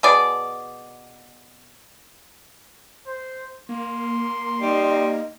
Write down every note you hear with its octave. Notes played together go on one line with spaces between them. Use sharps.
B2 G#4 D5
C5
A#3 C6
G3 D#4 D#5